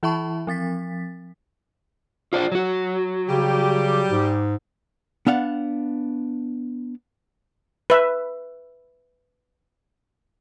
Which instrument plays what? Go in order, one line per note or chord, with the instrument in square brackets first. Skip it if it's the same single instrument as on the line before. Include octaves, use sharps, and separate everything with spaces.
[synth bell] E3 E4 E5 A5 B5 C#6
F3 C4 A6 B6
[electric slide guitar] F4 C5 D5
F#3 F#4
[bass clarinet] C#3 [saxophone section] G3 G4
[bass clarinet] G#2
[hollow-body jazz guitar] B3 D4 F5 F#5
[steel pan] B4 E5